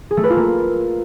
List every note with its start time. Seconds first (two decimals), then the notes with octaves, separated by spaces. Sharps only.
0.11 G#4
0.17 A3
0.24 B4
0.30 F4
0.36 A#3